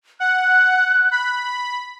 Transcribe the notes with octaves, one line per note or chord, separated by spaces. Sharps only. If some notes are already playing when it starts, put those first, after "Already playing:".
F#5 F#6
B5